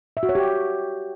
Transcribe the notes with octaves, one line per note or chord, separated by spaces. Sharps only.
E5
F#4
C#5
G4